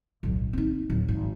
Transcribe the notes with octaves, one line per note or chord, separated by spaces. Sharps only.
D1 B1
C4 D#4
D1
G#1